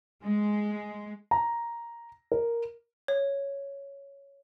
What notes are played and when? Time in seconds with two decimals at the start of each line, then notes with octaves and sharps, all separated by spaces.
0.24 G#3
1.31 A#5
2.32 A#4
3.08 C#5